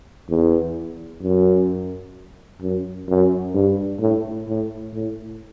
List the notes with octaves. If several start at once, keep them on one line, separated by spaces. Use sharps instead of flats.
E2
F#2
F#2
F#2
G2
A2
A2
A2